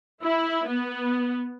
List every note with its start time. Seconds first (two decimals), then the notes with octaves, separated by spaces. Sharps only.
0.24 E4
0.67 B3